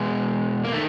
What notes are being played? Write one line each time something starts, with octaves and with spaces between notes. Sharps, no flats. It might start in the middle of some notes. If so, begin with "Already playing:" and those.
Already playing: B2 G#3
A#3
D#3 A3